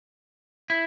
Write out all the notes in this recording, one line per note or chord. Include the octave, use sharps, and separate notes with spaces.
E4